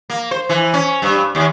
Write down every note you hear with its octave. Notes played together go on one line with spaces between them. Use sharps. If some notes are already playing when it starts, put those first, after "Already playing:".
A#3
C5
E3
C#4
G2
D#2